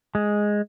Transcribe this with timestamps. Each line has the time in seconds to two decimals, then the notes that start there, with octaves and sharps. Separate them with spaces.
0.15 G#3